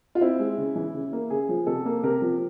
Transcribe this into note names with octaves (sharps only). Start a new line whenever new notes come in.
F4
C4 E4
G#3
C#3
E3
C#3
A#3
C#3 G#4
F3
C3 A4
A#3
C3 A#4
F3